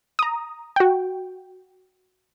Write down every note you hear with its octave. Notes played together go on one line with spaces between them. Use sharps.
A#5 D#6
F#4 G5